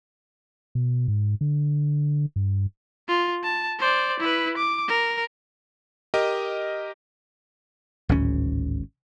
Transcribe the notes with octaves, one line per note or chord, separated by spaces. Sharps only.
B2
G#2
D3
G2
F4
A5
C5 D5
E4 B4
D6
A#4
G4 A#4 D#5
D1 G#1 C#3 C#4